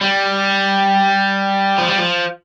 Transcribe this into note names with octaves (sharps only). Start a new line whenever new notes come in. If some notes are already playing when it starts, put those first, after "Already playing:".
G3
F3
G3
F3